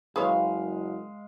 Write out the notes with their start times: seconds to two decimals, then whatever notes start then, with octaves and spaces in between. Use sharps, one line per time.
0.16 F#1 G#3 G#4 B4 C#5 F5